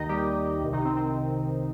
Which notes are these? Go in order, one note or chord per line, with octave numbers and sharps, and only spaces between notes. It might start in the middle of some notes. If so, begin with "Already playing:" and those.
Already playing: D#2 D#3 D#4 D#5
G3 G4
C2 C3 D#3
D#3 D#4
C4
C4